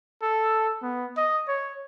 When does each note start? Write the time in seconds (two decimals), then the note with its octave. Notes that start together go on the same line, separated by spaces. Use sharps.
0.22 A4
0.83 B3
1.17 D#5
1.48 C#5